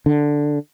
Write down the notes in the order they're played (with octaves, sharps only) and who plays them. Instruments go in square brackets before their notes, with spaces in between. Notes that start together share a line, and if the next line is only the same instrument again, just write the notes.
[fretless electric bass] D3